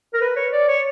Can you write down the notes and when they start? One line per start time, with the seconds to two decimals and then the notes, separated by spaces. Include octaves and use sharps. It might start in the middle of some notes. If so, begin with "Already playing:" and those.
0.14 A#4
0.21 B4
0.36 C#5
0.52 D5
0.68 C#5